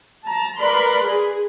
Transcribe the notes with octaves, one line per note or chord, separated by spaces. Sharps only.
A5 A#5
A#4 B4 D5 B5 C6
G#4